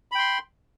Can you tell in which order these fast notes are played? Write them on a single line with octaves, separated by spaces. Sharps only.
B5 G5 C6